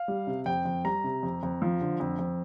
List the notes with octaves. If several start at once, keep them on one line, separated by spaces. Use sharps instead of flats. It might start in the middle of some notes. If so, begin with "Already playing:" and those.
Already playing: F5
G3
C3
F2 G5
F2
G3 A#5
C3
F2
F2
F3
D3
F2
F2